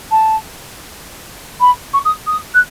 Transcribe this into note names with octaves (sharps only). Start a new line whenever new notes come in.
A5
B5
C#6
D#6
D#6
F#6